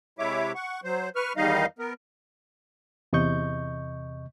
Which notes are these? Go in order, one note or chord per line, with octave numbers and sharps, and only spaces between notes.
C3 G#3 E4 C#5 E5 D6
F#5 C#6
F#3 C5
B4 C#6 F6
E2 D#3 G3 D#4 D#5 F5
B3 A#4
E2 C3 D#5 C#6 G6